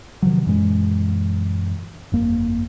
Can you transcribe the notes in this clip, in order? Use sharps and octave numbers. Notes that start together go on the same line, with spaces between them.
C3 D#3 F3 F#3
F#2 A#2 E3 G#3
G1 F2 A#3